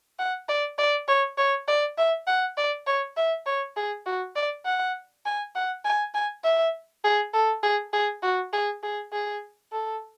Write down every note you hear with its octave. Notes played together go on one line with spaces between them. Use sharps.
F#5
D5
D5
C#5
C#5
D5
E5
F#5
D5
C#5
E5
C#5
G#4
F#4
D5
F#5
G#5
F#5
G#5
G#5
E5
G#4
A4
G#4
G#4
F#4
G#4
G#4
G#4
A4